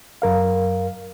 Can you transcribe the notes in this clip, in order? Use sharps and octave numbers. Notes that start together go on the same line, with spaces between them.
F#2 A#4 F5